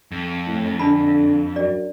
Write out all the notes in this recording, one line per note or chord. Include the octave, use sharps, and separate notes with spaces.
F2
A2
D3 D4 A5 B5
F#2 D5